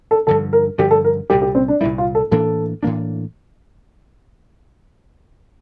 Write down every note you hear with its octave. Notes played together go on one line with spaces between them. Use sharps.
A4
G2 D3 F3 A4
A#4
G2 D3 F3 G4
A4
A#4
C2 A#2 G3 G4
G4
C4
D4
C2 A#2 G3 E4
F4
A4
A2 E3 A#3 D4 A4
A2 E3 A#3 D4